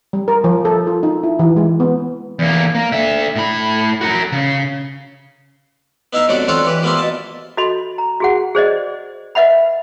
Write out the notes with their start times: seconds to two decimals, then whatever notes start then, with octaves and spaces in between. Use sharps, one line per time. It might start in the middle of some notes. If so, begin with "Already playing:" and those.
0.13 G3
0.28 A#4
0.44 F3
0.65 A4
0.87 F4
1.03 D#4
1.23 E4
1.39 E3
1.57 G#3
1.80 B3
2.39 E2 A#3
2.75 A#3
2.92 D3 E5
3.36 A2 B5
4.01 F#4 A#4
4.32 C#3
6.13 B3 D#4 E4 E5 F5 A#5
6.28 C2 B2 D3 F#3 F#4 D5
6.48 C4 D4 F4 F#4 A4 C#5
6.65 E3 G4 B4
6.82 F3 G3 A#3 B3 E4 F4
6.99 B2 A5
7.57 F#4 A4 D#5 B5 C6
7.98 A#5
8.20 F#4 G#4 F#5
8.55 G#4 C5 D5 D#5
9.35 B4 D#5 E5 F#5 B5